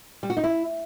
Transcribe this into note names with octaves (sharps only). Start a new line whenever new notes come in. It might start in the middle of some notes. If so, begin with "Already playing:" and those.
G3
F#4
D#4
E4